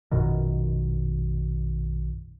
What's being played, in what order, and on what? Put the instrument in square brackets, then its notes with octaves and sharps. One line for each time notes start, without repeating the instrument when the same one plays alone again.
[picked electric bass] A#1 F#2 B2 D#3